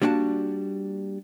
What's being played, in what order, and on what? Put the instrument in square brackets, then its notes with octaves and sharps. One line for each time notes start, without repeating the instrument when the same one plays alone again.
[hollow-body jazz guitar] G3 A#3 D4 F#4 A5